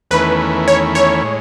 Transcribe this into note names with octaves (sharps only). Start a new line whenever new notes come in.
E2 D#3 A3 C#4 E4 B4
C#5
C#5
A2 G#3